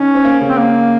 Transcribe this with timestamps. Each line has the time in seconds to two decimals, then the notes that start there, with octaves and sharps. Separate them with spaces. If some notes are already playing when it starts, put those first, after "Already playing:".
Already playing: D#3 C#4 D#4
0.15 C4
0.24 A#3
0.41 C#3 C#4
0.49 C4
0.58 A#3